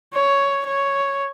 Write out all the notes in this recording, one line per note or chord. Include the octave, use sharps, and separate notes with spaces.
C#5
C#5